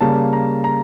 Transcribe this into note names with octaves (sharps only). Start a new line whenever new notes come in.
C#3 G3 A#3 A5
A#5
A#5